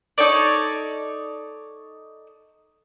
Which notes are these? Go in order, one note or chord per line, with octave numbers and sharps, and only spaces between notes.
D#4 A4 C#5 D5